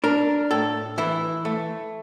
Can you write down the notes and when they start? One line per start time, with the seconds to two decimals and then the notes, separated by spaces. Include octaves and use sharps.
0.04 D4 A#4
0.51 A2 A4
0.98 E3 E4
1.45 A3